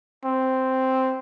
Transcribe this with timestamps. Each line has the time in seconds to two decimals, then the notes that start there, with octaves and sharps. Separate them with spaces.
0.25 C4